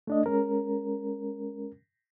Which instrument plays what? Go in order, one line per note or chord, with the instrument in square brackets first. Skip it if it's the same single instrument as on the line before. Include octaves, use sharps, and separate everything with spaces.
[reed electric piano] A3 D4 D#5
G#3 C#4 A#4